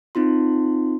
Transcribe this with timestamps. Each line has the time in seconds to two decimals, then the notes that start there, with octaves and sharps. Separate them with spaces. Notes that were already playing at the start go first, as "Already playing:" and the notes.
0.15 C4 D#4 F4 C6